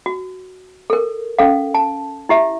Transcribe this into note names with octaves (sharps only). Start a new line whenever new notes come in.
F#4
A4 A#4
C#4 A4 F5
A5
E4 G4 E5